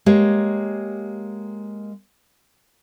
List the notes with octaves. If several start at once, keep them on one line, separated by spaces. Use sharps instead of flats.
G#3 A#3 G4 C#5